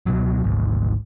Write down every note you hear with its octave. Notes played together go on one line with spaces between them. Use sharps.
C#2 B2 F#3
G#1 D2